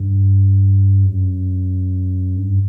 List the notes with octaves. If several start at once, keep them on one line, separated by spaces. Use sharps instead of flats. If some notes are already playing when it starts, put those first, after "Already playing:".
Already playing: G2
F#2
G2